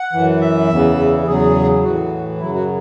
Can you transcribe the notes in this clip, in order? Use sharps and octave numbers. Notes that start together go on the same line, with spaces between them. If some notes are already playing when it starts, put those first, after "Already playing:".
Already playing: F#5
F#2 E3
E5
E2 C#3 E3
E2 C#3 F#3 G#4
A2 E3 F#4
F#2 C#3 F#3 E4
F#4